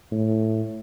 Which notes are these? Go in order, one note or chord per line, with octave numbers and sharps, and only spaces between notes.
A2